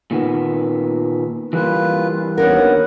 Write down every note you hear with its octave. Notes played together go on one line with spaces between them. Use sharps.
A#2 D#3 B3
E3 G3 A#3 F4 B4
D#2 B3 C#4 D4 A#4 F#5